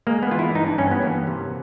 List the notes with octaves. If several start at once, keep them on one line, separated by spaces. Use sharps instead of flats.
G#3 A#3
B3
E3 F4
E4
G2 D#4
D4
G2 C#4
B3
E3 A#3
C3